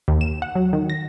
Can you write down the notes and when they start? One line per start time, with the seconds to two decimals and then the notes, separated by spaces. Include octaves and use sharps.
0.08 D#2
0.21 E7
0.42 F#5
0.55 F#3
0.73 D#3
0.90 A#6